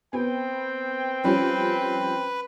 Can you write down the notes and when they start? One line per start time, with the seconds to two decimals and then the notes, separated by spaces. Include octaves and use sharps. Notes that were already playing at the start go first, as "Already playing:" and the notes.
0.13 B3 C4 G5
1.24 F3 G3 C#4 B4